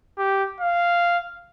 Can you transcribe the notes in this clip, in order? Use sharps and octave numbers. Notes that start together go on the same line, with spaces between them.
G4
F5